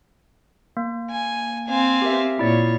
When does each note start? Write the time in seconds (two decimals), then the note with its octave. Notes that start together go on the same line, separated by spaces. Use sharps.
0.77 A#3
1.10 G#5
1.68 C4 F5 G#5
2.02 G4 A#4 E5
2.39 A#2 E4 C#5 D5